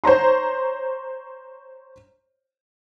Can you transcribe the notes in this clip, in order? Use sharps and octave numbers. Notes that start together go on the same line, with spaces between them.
C5 C#5 A#5 C6